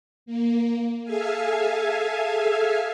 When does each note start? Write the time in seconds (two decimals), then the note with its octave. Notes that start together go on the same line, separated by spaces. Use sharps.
0.26 A#3
1.03 G#4 A4 E5 F5 G#5